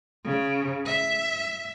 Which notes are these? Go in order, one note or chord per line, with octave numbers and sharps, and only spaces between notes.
C#3
E5